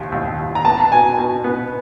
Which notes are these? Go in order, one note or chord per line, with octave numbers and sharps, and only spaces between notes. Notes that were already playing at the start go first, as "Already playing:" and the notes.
Already playing: D#2 F3
D#2
D#2
A#5
B3 A5
B2 G#5
B2
B3